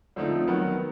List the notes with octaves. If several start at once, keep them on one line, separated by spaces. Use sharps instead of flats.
D3 F3 A3 C4 D#4
D#3 F#3 B3